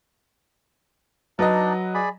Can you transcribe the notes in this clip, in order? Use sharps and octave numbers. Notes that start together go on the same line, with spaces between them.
F#3 D4 D#4 B4 D5 D#5
G#4 D5 B5